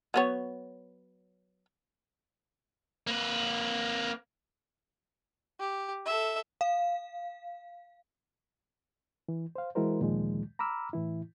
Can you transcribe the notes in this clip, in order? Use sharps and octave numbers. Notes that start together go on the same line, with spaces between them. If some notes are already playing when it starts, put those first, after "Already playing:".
F#3 B3 C#5
A#3 B4
G4
A4 E5
F5
E3
C5 F5
E3 G#3 E4 F#4 A#4 C5
D2 A#2 D#3 F3 G#3
A#5 B5 D6 E6 F6
A2 E3 E4